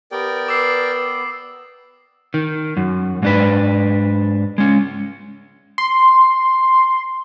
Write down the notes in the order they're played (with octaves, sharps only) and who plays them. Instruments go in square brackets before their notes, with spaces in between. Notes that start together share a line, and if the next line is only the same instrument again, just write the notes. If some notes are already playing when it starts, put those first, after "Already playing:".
[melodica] B3 [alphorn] G4 [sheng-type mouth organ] A#4 D5 G5
[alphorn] B4 [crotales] D6 E6 C7
[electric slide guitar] D#3
F#2
G#2 D4 B4
G#3 C#4
[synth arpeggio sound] C6